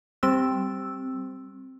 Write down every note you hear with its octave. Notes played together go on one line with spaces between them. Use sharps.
G3 C4 E6